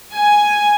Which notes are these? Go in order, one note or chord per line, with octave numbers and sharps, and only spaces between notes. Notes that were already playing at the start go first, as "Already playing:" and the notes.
G#5